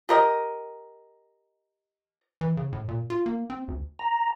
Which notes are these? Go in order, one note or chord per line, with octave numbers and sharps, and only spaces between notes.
G4 A#4 D#5
E3
C#3
A2
A#2
F4
A#3
C4
D2
A#5